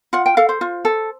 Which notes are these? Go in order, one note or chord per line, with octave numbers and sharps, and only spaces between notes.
F4 F#5
G5
A4 F5
C5
F4
A4